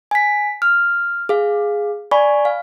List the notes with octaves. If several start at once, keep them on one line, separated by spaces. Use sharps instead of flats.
G#5 B6
F6
G#4 F5
D5 G#5 B5 C#6
F5